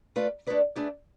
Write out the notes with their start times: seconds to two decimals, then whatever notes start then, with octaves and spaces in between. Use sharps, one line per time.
0.16 A3 F4 B4 D5
0.47 A3 D4 G#4 B4 D5
0.76 A3 D4 G#4 B4 D5